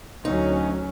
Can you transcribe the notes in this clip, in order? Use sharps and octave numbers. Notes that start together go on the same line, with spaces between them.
D2 F#3 C#4 D#4